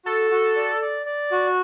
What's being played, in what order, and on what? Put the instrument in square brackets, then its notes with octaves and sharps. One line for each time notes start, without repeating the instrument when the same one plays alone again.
[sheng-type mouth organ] F#4 [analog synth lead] A4
[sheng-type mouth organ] F#4
D5
D5
D5
F#4